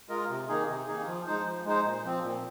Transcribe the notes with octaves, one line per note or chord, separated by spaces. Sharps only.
G#3 F4 A#4 D#5
C3
D#3 A#3 D#4 G#4
C3
D#3 A#3 D#4 G#4
F3
G#3 D#4 C5
F3
G#3 D#4 C5
A#2
F3 C4
A#2